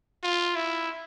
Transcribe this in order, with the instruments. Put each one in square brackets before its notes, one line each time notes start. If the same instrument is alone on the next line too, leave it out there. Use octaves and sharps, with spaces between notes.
[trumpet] F4
E4